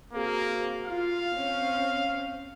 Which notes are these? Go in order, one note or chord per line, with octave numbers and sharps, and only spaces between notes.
A#3 C4 F#4 G#4
F4 F5
C4 C#4